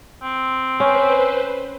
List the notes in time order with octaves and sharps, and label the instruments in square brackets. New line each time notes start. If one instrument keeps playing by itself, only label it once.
[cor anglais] C4
[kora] C#4 [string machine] B4 C5